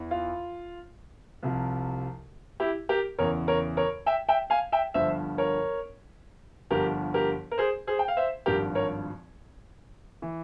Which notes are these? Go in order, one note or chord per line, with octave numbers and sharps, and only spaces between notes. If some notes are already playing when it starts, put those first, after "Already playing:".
Already playing: E2 E3
F4
C2 C3 F3
E4 G4
G4 A#4
E2 C#3 E3 A#4 C#5
A#4 C#5
A#4 C#5
E5 G5
E5 G5
F5 G#5
E5 G5
G1 G2 F3 C5 E5
A#4 C#5
G1 G2 F3 G4 A#4
G4 A#4
A#4
G#4 C5
G#4 C5
G5
F5
C5 E5
G#1 G2 F3 G4 A#4
A#4 C#5
E3